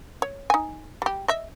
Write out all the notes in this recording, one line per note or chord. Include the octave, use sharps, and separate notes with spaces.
C#5
D#4 G#5
G3 G4
D#5 E5